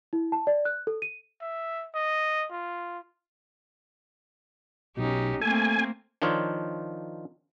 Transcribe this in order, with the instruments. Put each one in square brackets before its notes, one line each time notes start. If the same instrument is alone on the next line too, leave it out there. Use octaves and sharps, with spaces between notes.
[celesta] E4
A5
D5
F#6
A4
D#7
[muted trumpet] E5
D#5
F4
[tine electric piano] B1 B2 [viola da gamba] C#4 D#4 G4
[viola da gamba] A3 A#3 C4 [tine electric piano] A4 [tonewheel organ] G#5
[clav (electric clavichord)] D#3 F3 D4 D#4 F4 C#5